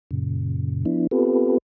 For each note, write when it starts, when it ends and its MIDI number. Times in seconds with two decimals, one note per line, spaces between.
0.11 0.85 42
0.11 0.85 46
0.11 0.85 49
0.86 1.07 53
0.86 1.07 59
0.86 1.07 62
0.86 1.07 64
1.11 1.58 59
1.11 1.58 60
1.11 1.58 65
1.11 1.58 67
1.11 1.58 69
1.11 1.58 71